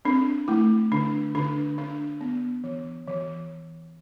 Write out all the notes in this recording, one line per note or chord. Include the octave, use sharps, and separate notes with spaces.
C4 D4
A3 E4
D3 D4
D3 D4
D4
B3
E3
E3